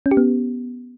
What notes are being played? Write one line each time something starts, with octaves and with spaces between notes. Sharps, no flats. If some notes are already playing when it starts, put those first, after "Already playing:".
C#4
G4
B3